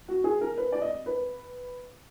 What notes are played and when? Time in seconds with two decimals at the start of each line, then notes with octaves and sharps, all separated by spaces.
0.08 F#4
0.24 G#4
0.41 A#4
0.58 B4
0.72 D5
0.82 D#5
1.06 B4